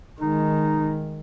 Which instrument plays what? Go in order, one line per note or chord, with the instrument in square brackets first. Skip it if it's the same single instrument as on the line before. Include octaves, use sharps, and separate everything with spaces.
[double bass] D#3 G#3 [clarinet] D#4